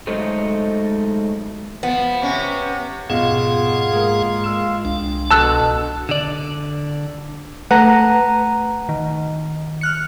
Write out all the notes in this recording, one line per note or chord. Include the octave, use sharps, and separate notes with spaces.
F#3 G#3 A3 D#4 A4 C5
F3 B3
C3 C#4
D#1 G#2 B2 F4 G#4 F5 F#5 E7
G#3 A#3
G#3 E6 E7
C2 D4
B2 F#4 A4 A5 E6 F#6
D3 D5
A3 B4 F#5 A#5 D#7
D#3
F6 F#6 C#7